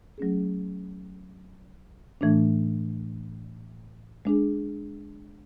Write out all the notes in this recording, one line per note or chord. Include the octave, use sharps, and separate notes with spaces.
F#3 A3 C#4 G#4
A2 E3 A3 D4
G#3 D4 G#4